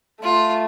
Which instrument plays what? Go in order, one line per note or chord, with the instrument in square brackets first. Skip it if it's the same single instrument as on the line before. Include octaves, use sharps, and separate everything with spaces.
[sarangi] A3 [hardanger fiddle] F4